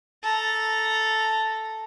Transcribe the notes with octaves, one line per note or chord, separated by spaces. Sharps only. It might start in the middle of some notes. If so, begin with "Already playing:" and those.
A4 A#5